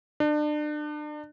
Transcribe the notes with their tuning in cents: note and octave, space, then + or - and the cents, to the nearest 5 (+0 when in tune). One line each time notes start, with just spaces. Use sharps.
D4 +35